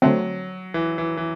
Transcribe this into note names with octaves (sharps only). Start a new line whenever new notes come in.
D3 F#3 A3 C4
E3
E3
E3